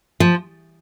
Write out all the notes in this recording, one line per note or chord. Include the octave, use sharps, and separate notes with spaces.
F3